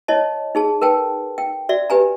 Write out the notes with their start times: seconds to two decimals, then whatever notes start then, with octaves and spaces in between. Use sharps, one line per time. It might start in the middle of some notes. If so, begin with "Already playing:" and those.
0.08 E4 C#5 D#5 A5
0.55 D#4 G#4 A5
0.82 A#4 B4 G5 A5
1.38 G5
1.69 F#4 D5 E5
1.90 G4 B4 G#5 A#5